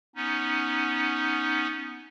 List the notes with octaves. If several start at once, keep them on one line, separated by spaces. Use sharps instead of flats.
B3 C#4 D#4